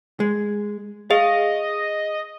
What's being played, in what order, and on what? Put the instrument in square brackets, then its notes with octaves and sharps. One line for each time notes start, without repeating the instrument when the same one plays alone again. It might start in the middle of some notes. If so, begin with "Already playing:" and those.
[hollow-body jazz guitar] G#3
[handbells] G#4 [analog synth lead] D#5 [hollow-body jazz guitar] F5